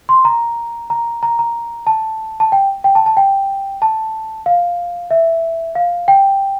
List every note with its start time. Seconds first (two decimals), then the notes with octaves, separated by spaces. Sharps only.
0.09 C6
0.25 A#5
0.90 A#5
1.23 A#5
1.39 A#5
1.87 A5
2.40 A5
2.52 G5
2.84 G5
2.95 A5
3.06 A5
3.17 G5
3.82 A5
4.46 F5
5.11 E5
5.75 F5
6.08 G5